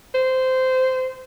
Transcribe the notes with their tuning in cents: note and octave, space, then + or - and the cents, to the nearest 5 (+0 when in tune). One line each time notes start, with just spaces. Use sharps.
C5 -15